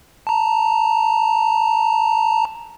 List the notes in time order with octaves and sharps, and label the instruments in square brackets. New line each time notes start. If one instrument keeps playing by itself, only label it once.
[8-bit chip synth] A5 A#5